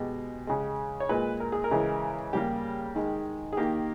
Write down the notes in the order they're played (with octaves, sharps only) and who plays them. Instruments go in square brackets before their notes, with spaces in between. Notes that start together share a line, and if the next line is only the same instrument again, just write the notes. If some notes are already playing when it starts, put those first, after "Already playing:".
Already playing: [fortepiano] B2 G#3 G4
C#3 G#3
C#5
A#2 G#3 B4
A#4
G#4
A#4
C#3 E3 G#3
C#3 G3 A#3 G4
D#3 G#3
G#4
D#3 A#3 G4